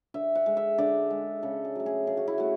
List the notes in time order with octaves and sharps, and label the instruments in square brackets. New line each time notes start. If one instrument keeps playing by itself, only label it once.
[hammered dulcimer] D3 E5
F#5
G#3
E5
D3 D5
G#3
C#3 A4
G#4
F#3 A3
G#4
C#3 G#4
F#4
E4
A3 F#4